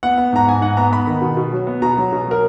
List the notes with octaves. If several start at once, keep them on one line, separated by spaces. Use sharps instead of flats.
B3 F#5
B3
G#2 A#5
G#2 G#5
G#2 F#5
B3 A#5
B3 B5
D#3
B2
B2
F#3
B3
B2 A#5
F#3
B2
F#3 A#4